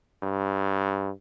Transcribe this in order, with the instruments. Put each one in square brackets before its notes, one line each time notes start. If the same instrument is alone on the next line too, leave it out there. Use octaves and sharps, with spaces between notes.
[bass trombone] G2